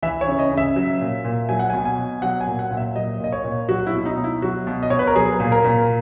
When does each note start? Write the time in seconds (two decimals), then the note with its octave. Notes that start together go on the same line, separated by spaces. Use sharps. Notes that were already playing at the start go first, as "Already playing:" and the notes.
0.03 E3 E5
0.21 C#5
0.27 C#3
0.39 D#5
0.52 C#3
0.57 E5
0.76 F#3
1.00 A#2
1.24 A#2
1.49 F#3 G#5
1.59 F#5
1.70 B2 G#5
1.85 G#5
1.98 B2
2.22 F#3 F#5
2.41 G#5
2.47 A#2
2.59 F#5
2.71 A#2
2.77 E5
2.96 F#3 D#5
3.20 A#2 D#5
3.32 C#5
3.44 A#2
3.69 F#3 F#4
3.87 E4
3.93 B2
4.06 D#4
4.17 B2
4.24 E4
4.42 F#3 F#4
4.67 B2
4.83 D#5
4.90 B2 C#5
4.99 B4
5.07 A#4
5.15 F#3 G#4
5.40 A#2
5.52 A#4
5.64 A#2